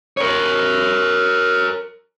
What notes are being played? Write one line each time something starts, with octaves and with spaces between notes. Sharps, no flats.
A#4 C#5